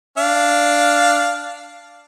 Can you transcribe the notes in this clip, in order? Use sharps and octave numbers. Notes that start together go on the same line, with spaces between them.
D4 F5